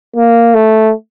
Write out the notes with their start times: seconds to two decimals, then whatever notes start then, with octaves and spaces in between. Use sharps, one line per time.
0.16 A#3
0.54 A3